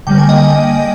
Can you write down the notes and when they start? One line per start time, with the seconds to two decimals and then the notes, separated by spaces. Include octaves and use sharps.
0.07 D3 G3 A#3 G5
0.18 G#5
0.29 D#5 G5